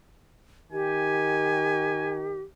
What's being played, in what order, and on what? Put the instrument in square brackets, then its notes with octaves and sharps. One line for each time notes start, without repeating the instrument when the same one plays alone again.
[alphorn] D#3 [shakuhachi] G4 [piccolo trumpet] G#5